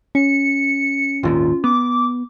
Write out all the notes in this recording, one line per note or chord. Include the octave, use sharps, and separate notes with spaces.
C#4 C#7
G#1 D#2 A#2 F4
B3 D6